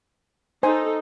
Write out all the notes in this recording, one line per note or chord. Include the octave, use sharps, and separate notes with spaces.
D#4 A4 C5 G#5